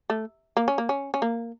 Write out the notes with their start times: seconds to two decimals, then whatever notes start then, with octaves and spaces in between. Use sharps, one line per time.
0.10 A3
0.57 A#3
0.68 C#4
0.78 A#3
0.89 C#4
1.14 C#4
1.22 A#3